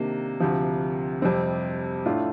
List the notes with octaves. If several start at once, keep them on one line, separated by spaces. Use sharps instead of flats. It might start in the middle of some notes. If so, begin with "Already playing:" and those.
Already playing: C3 D#3 A#3 D4
D2 C3 F3
F2 C3 G3 C4
A2 A3 D4 F4